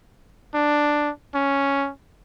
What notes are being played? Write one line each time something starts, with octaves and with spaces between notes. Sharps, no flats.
D4
C#4